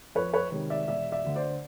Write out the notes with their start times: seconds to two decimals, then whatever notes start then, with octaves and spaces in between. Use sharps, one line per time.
0.15 F2 B4 C#5
0.33 B4 C#5
0.52 C3 D#3 G#3
0.70 D5 E5
0.88 E1 D5 E5
1.12 D5 E5
1.24 D2 D3
1.36 C5 D5